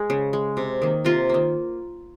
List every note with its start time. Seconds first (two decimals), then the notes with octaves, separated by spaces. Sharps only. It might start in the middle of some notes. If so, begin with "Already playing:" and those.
Already playing: G#3 G#4
0.10 C#3
0.33 G#3
0.57 C3
0.82 D#3 A#3
1.05 C3 F4
1.29 D#3 A#3